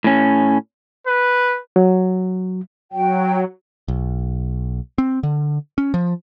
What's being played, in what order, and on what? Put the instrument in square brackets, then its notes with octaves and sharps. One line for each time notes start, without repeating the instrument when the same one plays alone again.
[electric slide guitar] A2 C#4
[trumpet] B4
[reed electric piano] F#3
[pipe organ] F#3 [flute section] F#4 G5
[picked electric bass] B1
C4
D3
C#4
F3